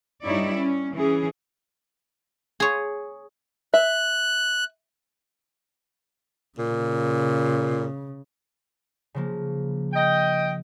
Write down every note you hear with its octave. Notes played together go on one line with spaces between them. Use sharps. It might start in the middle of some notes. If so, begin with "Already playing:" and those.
G2 G3 D#4 E4 C#5 D5
C#4
E3 C#4 G#4
G#4 C#5
E5 F#6
A#2 C#3
C#3 F3 A#3
D#5 G5